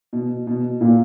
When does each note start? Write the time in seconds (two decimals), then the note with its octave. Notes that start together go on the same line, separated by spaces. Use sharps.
0.13 B2
0.47 B2
0.81 A#2